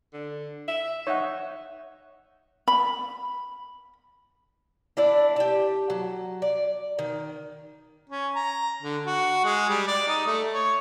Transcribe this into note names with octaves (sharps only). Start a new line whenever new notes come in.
D3
E5
D#4 C#5 E5 F#5
B5
D4 E4 D5
G4 A5
F#3
D5
D#3
C#4
A#5
D3
F#4
G#3
G3
D5
D#4
A3
C#5